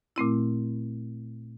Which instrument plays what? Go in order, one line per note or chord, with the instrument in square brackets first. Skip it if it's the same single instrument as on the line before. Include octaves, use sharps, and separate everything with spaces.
[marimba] A#2 A3 C4 E4